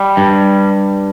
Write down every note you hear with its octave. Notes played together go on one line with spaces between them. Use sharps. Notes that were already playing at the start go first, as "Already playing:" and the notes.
Already playing: G3
G2